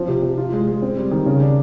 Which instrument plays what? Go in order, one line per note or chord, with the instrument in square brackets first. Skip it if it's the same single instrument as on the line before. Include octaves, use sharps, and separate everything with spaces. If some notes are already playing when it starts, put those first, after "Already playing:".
Already playing: [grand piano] F3 C4
C3
C3
F4
G#3
G#3
C4
G3
D#3
C#3
D4